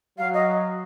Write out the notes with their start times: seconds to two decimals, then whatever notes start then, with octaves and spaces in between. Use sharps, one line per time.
0.18 F#3 F5
0.33 D#5